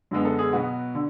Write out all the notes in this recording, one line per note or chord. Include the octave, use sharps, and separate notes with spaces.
F#2 D3 G#3 B3
A4
G#4
B2 F#3 B3 F#4
D3